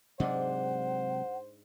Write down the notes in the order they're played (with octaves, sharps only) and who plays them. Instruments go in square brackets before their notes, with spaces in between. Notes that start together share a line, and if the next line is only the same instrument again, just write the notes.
[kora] G#2 D4 [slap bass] C3 F#3 G#3 [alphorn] C5 [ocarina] F#5